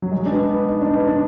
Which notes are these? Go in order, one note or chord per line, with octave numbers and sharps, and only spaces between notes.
F#3
G#3
D4
B3
B3
D#4
D4
B3
D4